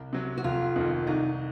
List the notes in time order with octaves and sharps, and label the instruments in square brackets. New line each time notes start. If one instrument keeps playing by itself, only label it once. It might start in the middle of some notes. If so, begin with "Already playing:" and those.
Already playing: [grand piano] C2
C3 F#3
[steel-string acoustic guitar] F#4
[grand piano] F1 [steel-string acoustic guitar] F4
[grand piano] F2 D#3
[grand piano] C2 [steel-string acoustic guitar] D#4